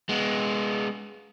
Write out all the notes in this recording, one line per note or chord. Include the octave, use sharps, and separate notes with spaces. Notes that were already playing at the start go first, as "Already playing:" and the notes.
G#3 B3